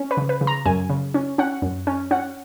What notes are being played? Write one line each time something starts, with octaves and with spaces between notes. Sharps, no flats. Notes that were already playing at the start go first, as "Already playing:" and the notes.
Already playing: C#4
B4
C#3
B4
C#3
A#5
F#2 G#5
C#3
C#4
C#4 F#5
F#2
C#4
C#4 F#5